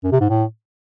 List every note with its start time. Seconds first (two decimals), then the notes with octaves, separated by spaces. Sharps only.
0.04 F#2
0.12 C3
0.21 G#2
0.29 A2